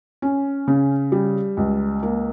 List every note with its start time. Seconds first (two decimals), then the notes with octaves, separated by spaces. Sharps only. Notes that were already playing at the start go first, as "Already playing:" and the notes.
0.22 C#4
0.68 C#3
1.12 G3
1.57 C#2
2.03 A#3